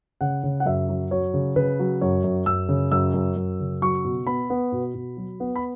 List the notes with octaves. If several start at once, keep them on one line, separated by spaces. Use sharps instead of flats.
C#3 F#5
C#3
F#5
F#2 E5
F#3
F#3 C#5
C#3
C#3 B4
F#3
F#2 C#5
F#2
F#2 E6
C#3
F#2 E6
F#2
F#2
C#3
F#3 C#6
B2
B3 B5
B3
B2
B2
F#3
B3
B5